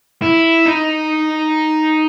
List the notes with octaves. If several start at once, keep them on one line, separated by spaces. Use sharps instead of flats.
E4
D#4